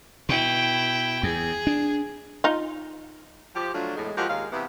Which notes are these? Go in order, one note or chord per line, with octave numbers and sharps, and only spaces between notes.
B2 E4 G5
E2 G#4
D4
D#4 F4
F3 G4
F3 F#3 A3 D4 F4
E2 A2 G#3
F3 G#3 A#3 F#4 G4
D#2 G#3 A#4 F5
C3 E3 B3